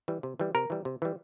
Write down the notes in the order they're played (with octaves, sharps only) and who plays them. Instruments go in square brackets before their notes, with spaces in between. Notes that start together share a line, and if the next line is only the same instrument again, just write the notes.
[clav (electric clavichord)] E3 G3
C3
E3 G3
C3 A#4
E3 G3
C3
E3 G3